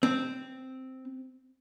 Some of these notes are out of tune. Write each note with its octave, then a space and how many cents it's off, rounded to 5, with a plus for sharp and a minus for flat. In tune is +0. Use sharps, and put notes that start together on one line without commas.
C4 -5